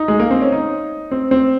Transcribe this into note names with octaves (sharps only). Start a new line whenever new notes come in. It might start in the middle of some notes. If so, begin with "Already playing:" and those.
Already playing: D#4
G#3
A#3
C4
C#4
D#4
C4
C4